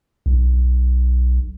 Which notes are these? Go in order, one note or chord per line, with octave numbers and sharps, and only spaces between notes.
B1